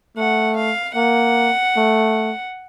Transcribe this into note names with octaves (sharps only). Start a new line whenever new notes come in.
A3 F#5
F5
A#3 F#5
A3